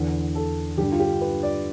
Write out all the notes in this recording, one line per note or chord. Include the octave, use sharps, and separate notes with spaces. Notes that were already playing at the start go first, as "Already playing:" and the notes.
Already playing: E2 D3 B4
A4
G2 D3 G4
F4
G4
B4
D5